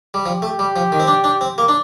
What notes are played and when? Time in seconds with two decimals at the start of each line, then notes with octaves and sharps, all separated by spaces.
0.14 G3
0.26 F3 G4
0.42 A3
0.59 G3
0.76 F3
0.92 D#3
1.00 C4
1.07 D4
1.24 D4
1.41 C4
1.58 A#3
1.68 D4